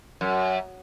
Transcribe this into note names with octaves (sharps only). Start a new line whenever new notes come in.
F#2